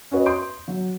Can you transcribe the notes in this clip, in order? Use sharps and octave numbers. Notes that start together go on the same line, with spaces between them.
C#4 F#4 B4 C#5 D#5
C6 D#6 G6 D7
F#3